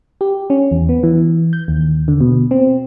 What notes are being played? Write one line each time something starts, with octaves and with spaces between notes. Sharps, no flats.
G4
C#4
E2
B3
E3
G6
D#2
D3
B2
C4